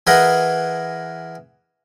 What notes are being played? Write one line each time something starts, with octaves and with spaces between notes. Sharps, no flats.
E3 G#4 A#4 B4 D#5 F#5